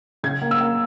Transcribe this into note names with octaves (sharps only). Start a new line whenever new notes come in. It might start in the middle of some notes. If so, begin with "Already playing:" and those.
C#3 G#6
A#3
E6
A#3